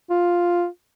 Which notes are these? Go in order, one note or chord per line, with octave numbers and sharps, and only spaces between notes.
F4